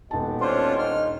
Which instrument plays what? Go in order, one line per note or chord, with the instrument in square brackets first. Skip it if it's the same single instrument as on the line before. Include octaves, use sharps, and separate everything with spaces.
[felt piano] D#1 A5 [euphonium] B2
[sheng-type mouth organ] C#4 D4 F4 [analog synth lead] C5
[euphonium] D#4 [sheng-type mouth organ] F6